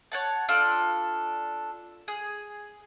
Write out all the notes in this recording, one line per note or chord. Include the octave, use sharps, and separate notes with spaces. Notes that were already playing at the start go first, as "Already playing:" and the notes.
C#5 F#5 A5
D4 F4 A4 D5
G#4